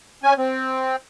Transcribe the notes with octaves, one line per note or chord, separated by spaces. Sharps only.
C#4 G#5
C4